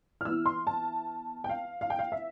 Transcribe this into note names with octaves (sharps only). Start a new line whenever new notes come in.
F6
E3 B3 E4 E6
C6
A5
G5
F5
F5
G5
F5
E5